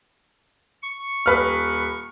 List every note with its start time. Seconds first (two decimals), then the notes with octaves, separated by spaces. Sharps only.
0.83 C#6
1.26 D#1 B4 F6